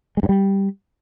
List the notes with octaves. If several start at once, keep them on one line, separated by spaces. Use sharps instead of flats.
G#3
G2
G3